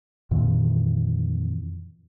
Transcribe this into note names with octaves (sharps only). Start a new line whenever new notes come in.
F2 A#2 D#3 E3